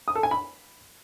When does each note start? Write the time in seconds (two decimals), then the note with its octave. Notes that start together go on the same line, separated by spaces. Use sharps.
0.08 D#6
0.15 A4
0.23 G#5
0.31 B5